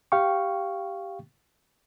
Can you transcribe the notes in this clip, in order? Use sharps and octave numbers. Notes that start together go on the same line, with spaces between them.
G4 F5 G5 C#6